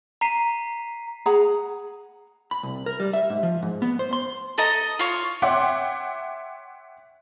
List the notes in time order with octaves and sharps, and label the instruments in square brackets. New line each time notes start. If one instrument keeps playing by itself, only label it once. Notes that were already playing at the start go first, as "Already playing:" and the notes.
[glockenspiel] A#5 B6 C7 D#7
[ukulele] G#4 F#5 A#5
[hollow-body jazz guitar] B5
C2
A#4
G3
E5
G#2
F3
G#2
B3
C5
C6
[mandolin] A4 D#5 A#5
F4 C#5
[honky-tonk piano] C#5 E5 F#5 G5 C6 D6